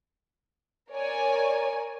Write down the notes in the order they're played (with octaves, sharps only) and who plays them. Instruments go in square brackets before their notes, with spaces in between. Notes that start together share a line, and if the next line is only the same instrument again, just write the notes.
[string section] A#4 C#5 D5 G#5